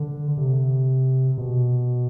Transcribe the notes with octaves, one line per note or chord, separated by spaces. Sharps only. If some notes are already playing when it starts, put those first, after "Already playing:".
Already playing: D3
C3
B2